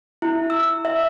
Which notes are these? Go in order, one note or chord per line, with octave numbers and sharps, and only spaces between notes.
E4
E6
E5